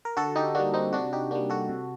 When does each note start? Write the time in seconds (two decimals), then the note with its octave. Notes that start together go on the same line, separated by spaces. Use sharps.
0.05 A#4
0.17 D3 F#4 A4
0.36 D#4 G4
0.55 G3 A#3 D4 F#4
0.74 C4 D#4
0.93 C3 D4 F#4
1.13 D#4 G4
1.31 G3 A#3 D4 F#4
1.50 F#4 A4
1.69 C3